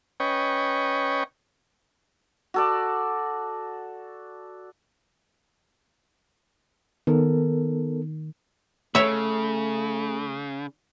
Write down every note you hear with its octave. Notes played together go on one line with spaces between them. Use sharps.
C#4 B4 C#5 D#5 G5
F#4 A4 D5
D#3 B3 A4 A#4
C#3 A3 C#5 E5